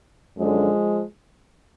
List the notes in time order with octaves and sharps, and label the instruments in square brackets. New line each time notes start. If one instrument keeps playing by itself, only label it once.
[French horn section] F#2 D3 F3 G#3